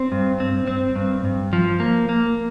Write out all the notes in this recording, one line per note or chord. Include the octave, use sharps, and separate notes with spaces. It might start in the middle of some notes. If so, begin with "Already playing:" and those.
Already playing: C4
G2
C4
C4
G2
G2
F3
A#3
A#3